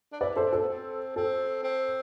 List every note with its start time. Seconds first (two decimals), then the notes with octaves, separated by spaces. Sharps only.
0.12 D4
0.21 E4 B4 D5
0.36 A4 C5
0.44 D4
0.52 A4 C5
0.61 B3
0.68 C4
1.16 C4 A4
1.64 C4